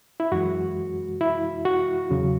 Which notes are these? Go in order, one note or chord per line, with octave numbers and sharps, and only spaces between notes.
E4
F#2 E3 G#3 F#4
E4
F#4
E2 C#3 F#3